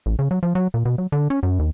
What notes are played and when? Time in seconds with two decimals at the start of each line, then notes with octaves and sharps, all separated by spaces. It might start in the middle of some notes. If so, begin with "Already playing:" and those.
0.06 A1
0.19 C#3
0.31 F#3
0.43 F3
0.55 F#3
0.74 A#2
0.85 B2
0.98 F#3
1.12 D3
1.30 C#4
1.43 F#2
1.59 D#2